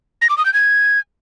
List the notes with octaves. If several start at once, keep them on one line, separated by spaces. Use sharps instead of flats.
A#6
D6
D#6
G6
G#6